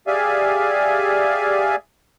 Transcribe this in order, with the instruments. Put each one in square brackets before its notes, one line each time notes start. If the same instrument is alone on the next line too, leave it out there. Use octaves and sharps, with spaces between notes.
[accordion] G4 G#4 D5 E5 F5 G#5